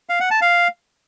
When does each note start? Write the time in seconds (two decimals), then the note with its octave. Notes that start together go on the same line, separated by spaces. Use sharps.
0.09 F5
0.20 F#5
0.31 A5
0.41 F5